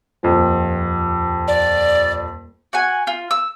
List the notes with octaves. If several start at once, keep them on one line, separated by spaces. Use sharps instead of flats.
D#1 F2 F3
D5
F#4 F#5 G#5
F4
E6